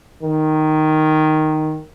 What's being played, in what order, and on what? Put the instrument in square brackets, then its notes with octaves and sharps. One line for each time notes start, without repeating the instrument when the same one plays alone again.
[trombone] D#3